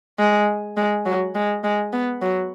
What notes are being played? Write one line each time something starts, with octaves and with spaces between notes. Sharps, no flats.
G#3
G#3
F#3
G#3
G#3
B3
F#3